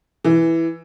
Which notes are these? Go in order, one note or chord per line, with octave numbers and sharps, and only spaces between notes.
E3